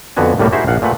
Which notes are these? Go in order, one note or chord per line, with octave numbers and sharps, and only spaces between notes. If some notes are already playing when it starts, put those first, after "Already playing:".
F2 D3 B3 F#4 G#5
C2 A2 G3 A#3 F#4
D#4 E4 F#4 G#4 C5 E5
A#1 F5 F#5
A#2 A3 B4 F#5